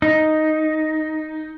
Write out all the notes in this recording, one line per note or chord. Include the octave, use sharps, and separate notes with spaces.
D#4